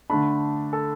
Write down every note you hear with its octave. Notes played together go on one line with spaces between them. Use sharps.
D3 A3 D4 B5
A4